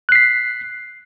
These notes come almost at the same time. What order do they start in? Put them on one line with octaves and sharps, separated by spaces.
F#6 C7 B6